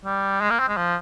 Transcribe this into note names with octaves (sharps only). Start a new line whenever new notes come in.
G3
G#3
A#3
C4
G#3
F3